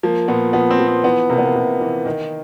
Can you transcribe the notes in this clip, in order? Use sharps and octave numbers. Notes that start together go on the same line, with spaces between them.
F3 A#3
A#2 B3
F3 B3
C4
F3
C4
E3 B3
C3 A#3
B3
A#3
C3
E3
D#3